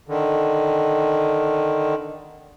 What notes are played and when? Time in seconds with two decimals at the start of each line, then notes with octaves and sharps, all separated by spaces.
0.08 D3 D#3